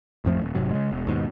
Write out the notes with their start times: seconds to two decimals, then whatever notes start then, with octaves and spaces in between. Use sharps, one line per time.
0.25 A1 F2 F3 A3
0.42 D#1
0.55 F1 G#2 C3 F#3
0.71 C#3 G#3
0.92 E1
1.07 D#2 G#2 B2